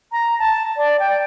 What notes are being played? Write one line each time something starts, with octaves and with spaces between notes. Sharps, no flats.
A#5
A5
D5
G5